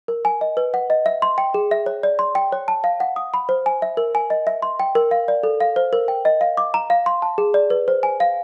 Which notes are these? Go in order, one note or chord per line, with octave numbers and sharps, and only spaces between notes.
A#4
G#5
D#5
B4
F#5
D#5
E5
C6
G5
G#4
E5
C#5
D5
C6
G5
C#5
A5
F5
F#5
D#6
B5
C5
G#5
E5
A#4
G#5
D#5
E5
C6
G5
A#4
F5
D5
A4
F5
C5
A#4
G5
D#5
F5
D6
A#5
F5
C6
A5
G#4
D5
B4
C5
G#5
F5